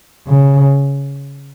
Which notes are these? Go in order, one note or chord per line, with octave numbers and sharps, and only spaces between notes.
C#3